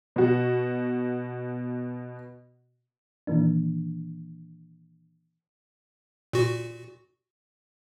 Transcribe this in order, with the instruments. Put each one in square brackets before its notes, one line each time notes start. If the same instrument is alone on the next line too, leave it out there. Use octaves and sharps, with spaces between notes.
[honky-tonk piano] B2 F#4
[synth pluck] A#2 D#3 E3 A#3 D4
[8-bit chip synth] A#2 F#4